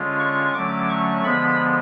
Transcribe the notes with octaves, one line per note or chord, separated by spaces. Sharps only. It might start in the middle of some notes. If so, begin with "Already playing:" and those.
Already playing: D3 G#3 C#4 F4
C#6
D3 F#3 A3 C#4 D6
C#6
D3 F3 G#3 B3 B5